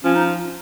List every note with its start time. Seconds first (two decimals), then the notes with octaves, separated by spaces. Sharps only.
0.04 F3 C#4
0.15 D#4